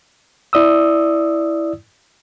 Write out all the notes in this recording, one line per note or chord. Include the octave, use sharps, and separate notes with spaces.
E4 D5 D#6 E6